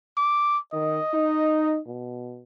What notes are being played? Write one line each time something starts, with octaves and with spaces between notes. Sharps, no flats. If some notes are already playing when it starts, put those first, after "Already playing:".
D6
D#3 D#5
D#4
B2